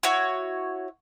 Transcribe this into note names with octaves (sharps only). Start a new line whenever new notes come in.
E4 F#4 C#5